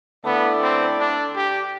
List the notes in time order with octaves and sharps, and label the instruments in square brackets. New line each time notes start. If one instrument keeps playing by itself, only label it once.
[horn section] D3 A3 E4 A4 D5 [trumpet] B3
[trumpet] C4
D4
G4